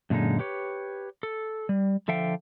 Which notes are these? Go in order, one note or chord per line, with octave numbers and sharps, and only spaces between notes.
F#2 A#2 D3 G#3 D#4
G4 B4 C#5
A4
G3
D3 F3 A4 E5 F5 G5